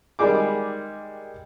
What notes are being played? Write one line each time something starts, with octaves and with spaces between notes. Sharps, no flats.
D#3 G3 G#3 G#4 D6